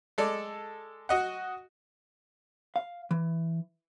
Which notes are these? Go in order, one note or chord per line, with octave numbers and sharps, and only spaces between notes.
G#3 A4 D5
F#4 D#5 F#5
F5
E3